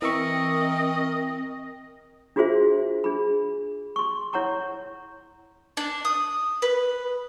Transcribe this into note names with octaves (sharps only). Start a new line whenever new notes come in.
E3 C4 A#4 D#5 E5 C#6
D4 F4 F#4 G#4 C5 E5
D4 G#4 B5
C6 C#6
E4 C#5 F#5 A#5 C#6
D4
D#6
B4